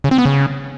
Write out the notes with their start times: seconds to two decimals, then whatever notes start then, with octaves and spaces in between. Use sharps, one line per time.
0.04 C#3
0.11 C4
0.18 B3
0.25 C#3